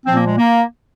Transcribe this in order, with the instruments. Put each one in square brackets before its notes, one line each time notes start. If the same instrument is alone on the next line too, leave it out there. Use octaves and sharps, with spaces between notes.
[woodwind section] A#2 F3 C4
A#3
G#3
A#3